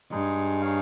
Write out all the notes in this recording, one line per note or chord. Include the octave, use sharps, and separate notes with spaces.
G2 G#3 D#4 G#4
D#4 G#4 C#5 F5